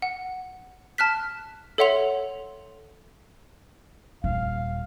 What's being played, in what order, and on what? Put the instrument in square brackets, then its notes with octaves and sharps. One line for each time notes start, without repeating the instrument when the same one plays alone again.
[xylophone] F#5
A5 F6 F#6 B6
A4 C#5 E5 F#5 C6 F7
[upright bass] D#1 [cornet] F5